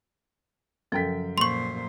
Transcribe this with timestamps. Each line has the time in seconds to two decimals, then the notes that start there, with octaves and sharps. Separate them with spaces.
0.92 F#2 C#3 F3 A4 G5 B6
1.38 A#2 C5 C6 C#6